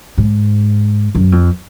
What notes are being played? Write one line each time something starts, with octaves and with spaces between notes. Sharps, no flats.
G#2
F#2
F2